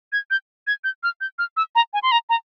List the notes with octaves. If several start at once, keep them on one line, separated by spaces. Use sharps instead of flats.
G#6
G6
G#6
G6
F6
G6
F6
E6
A#5
G#5
C6
A#5
A#5